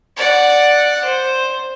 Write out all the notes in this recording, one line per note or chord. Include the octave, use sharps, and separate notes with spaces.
D5 F#5
C5